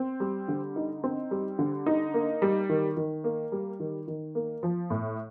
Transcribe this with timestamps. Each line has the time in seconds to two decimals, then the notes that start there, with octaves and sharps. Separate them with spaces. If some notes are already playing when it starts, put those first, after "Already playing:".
Already playing: C4
0.20 G3
0.48 D3
0.76 D#4
1.04 C4
1.31 G3
1.59 D3
1.86 D#4
2.14 A#3
2.42 G3
2.69 D#3
2.97 D#3
3.24 A#3
3.52 G3
3.80 D#3
4.08 D#3
4.35 A#3
4.63 F3
4.90 A2